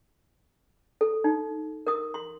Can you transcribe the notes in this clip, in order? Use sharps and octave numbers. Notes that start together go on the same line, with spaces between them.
A4
D#4
A#4 D#6
C6